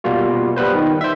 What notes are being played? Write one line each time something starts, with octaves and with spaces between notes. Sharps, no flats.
B2 G3 A#3 F4 F#4
G3 B3 B4 C5
D#3
C5 E5